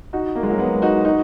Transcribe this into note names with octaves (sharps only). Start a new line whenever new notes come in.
D#4 F#4
A#3
G#3
F#3 A#3
G#3 B3
D#4 F#4
D#4 F#4